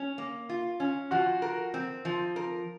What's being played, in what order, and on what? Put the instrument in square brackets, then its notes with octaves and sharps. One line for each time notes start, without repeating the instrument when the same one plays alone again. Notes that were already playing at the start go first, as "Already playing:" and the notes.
Already playing: [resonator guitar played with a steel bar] C#4
A#3
F4
C#4
[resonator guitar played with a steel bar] F3 [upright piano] F#4
[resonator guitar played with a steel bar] A#4
C4
F3
A#4